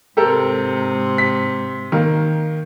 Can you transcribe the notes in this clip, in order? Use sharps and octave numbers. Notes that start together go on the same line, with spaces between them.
G#2 C3 G4 A4 A#4
B6
D#3 A#3